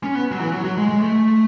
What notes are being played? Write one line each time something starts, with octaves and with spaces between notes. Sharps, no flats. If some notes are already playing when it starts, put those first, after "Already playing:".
C#4
B3
F#3
E3
F#3
F#3
G#3
G#3
A3